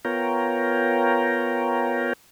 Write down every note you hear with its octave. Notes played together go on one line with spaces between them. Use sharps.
B3 F4 A#4 C#5 G5 A#5